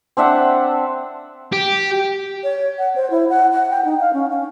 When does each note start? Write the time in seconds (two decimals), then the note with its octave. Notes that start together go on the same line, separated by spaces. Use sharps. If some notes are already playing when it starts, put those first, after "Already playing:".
0.17 C4 D4 E5 F#5
1.53 G4
2.44 C#5
2.78 F#5
2.96 C5
3.10 E4
3.30 F#5
3.53 F#5
3.71 G5
3.85 D#4
4.01 F5
4.13 C#4
4.29 C#4